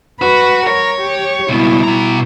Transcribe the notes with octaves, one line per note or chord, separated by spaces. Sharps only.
F#4 B4
A#4 C#5
G4
C#2 B2 G3 E4
B2 A#5